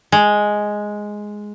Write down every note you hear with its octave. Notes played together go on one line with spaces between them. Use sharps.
G#3